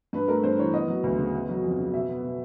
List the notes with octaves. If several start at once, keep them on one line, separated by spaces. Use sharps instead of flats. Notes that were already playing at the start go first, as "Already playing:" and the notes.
G2 B4
A3 A#4
G2 C5
E3 C#5
B3 D#5
F#3
D2
C#3
B3
F#3
F2
C#3
B2 E5
B3
B2